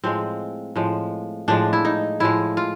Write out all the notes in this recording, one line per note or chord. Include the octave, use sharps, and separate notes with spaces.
A2 F3 G#3 C4
A2 F3 G#3
A2 F3 G#3 D4
E4
D#4
A2 F3 G#3 E4
F4